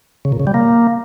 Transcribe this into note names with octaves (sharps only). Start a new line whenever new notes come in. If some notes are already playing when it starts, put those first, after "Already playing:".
C#3
A#2
C#3
G3
A#3